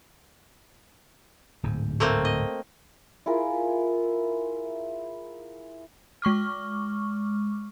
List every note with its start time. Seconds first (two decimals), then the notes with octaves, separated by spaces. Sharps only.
1.63 D1 G#2
2.00 A3 A#3 C4
2.25 D#5
3.26 E4 F4 G#4 A#4
6.22 G#3 C#6 D6 F6